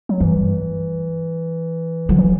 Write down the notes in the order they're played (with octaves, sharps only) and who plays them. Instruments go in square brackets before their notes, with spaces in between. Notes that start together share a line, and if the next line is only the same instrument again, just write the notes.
[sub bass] F#3
[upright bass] G2 [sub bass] E3
[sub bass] D3 [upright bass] F#3
[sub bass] E3